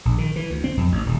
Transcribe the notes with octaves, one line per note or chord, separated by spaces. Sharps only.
A#1
D#3
E3
D2
C4
F2
A1
D#1